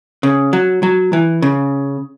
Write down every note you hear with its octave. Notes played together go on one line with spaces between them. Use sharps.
C#3
F#3
F#3
E3
C#3